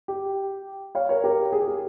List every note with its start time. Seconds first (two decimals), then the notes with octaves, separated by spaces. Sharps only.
0.08 G4
0.95 C#5 F5
1.09 A#4 C#5
1.24 G4 A#4
1.53 G#4
1.60 G4
1.68 G#4